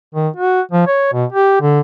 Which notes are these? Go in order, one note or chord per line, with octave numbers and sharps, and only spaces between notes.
D#3
F#4
F3
C#5
B2
G4
D3